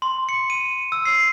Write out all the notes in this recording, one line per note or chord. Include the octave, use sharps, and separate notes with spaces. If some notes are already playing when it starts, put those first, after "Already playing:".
C6
C#7
D#7
E6
C7